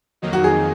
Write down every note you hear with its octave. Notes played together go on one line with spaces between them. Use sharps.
F2 D#3 F#3 A#3 D#4
F#4
G#4